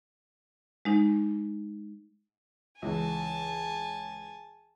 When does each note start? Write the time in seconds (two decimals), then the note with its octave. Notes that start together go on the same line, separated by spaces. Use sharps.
0.85 G#3 D#4
2.82 C#2 E3 G#5 A5